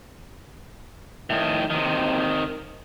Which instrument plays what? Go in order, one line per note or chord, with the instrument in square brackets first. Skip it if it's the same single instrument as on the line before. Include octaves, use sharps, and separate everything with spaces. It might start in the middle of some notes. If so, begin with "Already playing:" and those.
[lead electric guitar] A2 D#3
C3 D#3